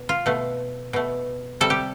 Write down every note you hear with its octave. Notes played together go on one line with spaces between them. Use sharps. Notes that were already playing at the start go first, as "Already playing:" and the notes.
Already playing: B2
F4
B2 A3
B2 A3
C3 G3 A4
G4